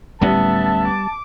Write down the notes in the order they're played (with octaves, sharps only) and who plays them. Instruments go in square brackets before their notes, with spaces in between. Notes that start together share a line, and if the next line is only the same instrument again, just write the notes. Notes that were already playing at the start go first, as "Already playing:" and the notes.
[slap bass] D1 A2 C#4 [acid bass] G3 [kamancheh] B3 E5 [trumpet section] A5
[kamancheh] D6